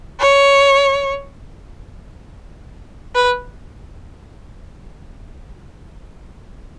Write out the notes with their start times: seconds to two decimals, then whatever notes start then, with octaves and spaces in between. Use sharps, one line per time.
0.20 C#5
3.15 B4